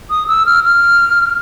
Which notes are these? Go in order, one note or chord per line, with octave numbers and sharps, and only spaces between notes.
D#6
E6
F6
F6